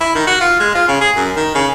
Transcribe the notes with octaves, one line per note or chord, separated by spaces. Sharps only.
E4
D#3
F#4
F4
G#3
F4
C#3
G#4
F#2
D#3
C#3